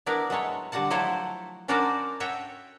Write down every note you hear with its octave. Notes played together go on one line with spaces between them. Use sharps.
B3 D4 E4 A#4 D5
F#3 G#3 A3 C#5
D3 G3 F#4 F#5 A5
F3 F#3 A3 E4 A4 C5
C#4 D4 F#4 A#4 C5 D5
F#4 A4 C#5 E5 G5